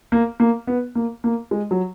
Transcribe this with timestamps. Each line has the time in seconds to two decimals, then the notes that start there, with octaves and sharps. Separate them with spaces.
0.12 A#3
0.40 A#3
0.67 B3
0.95 A#3
1.24 A#3
1.51 G#3
1.71 F#3